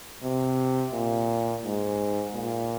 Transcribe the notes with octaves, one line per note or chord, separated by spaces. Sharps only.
C3
A#2
G#2
A#2